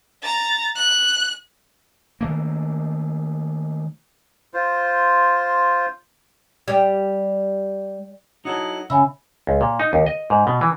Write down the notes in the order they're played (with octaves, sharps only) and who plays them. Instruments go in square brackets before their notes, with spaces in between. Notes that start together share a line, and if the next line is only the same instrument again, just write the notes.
[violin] A#5 A6
F#6
[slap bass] D#3 A3 A#3
[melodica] F4 C5
[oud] G3
[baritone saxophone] F#3 [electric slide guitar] D#4 E4 A4
[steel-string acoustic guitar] C#3 [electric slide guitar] E5 [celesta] G#5 B5 E6
[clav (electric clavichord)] C#2
A#2
D#4
D#2
D#5
G#2
B2
E3